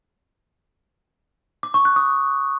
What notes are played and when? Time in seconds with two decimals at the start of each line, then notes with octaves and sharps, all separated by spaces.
1.63 D6
1.74 C#6
1.85 F#6
1.96 D#6